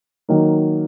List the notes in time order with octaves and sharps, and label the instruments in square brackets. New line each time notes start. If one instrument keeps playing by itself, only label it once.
[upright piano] D#3 F#3 A#3 D#4